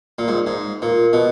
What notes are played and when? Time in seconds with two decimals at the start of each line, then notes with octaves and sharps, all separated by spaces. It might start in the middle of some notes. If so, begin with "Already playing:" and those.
0.19 A#2
0.28 G#2
0.47 G#2
0.82 A#2
1.13 B2